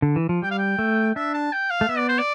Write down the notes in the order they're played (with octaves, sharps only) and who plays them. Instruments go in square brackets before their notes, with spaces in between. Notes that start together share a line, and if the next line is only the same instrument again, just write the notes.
[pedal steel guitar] D3
E3
F3
[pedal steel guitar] G3 [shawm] G5
[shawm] F5
G5
[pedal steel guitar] A3
[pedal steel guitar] D4 [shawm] E5
[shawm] A5
G5
F5
[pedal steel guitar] A3
[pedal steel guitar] B3 [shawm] E5
[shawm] D5
C5
D5